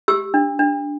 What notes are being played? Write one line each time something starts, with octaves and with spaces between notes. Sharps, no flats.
G4 E6
D4
D4